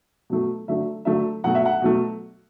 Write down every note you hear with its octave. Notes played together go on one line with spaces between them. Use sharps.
B2 F#3 A3
D3 F#3 A3 E5
D3 F#3 A3 E5
B2 F#3 A3 F#5
E5
F#5
B2 F#3 A3